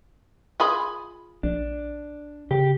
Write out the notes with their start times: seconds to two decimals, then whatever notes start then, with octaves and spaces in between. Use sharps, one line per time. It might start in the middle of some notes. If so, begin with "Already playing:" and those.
0.60 F4 G#4 B5
1.43 A#1 D4
2.51 C#3 G4